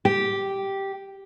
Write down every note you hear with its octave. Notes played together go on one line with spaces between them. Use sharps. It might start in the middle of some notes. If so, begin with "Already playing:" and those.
G4